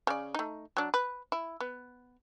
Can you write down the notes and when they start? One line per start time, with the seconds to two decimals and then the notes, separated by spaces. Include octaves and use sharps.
0.07 C#3 D5
0.34 A3 D#4
0.77 F#3 D4
0.94 B4
1.32 E4
1.60 B3